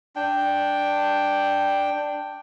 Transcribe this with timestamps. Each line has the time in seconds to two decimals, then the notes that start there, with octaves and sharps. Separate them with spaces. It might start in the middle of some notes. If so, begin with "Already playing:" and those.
0.16 D4 G5